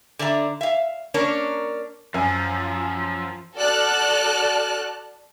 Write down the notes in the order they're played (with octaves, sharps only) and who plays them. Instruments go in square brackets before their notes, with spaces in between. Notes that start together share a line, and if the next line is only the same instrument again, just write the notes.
[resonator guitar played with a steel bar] D3 D5 E5 A#5
E5 F5
A#3 C#4 D4 A#4 C#5
[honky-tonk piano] F#2 G#5 [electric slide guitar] F3
[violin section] F#4 A4 D5 A5 F6 F#6